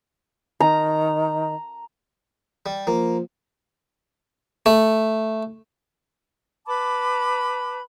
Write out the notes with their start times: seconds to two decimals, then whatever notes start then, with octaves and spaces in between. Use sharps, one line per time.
0.60 D#3 A#5
2.66 G3
2.87 F3 A#3
4.66 A3
6.67 B4 A5 B5 D6